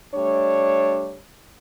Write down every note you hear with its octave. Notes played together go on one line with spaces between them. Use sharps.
G3 A3 D4 C#5